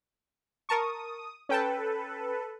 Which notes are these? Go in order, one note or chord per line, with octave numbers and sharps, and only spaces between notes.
A#4 A5 C#6 D#6
C#4 A4 B4 G5 A5